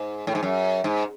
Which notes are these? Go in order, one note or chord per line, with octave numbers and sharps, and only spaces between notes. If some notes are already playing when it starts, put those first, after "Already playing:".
Already playing: G#2
A2
G#2
F#2
G#2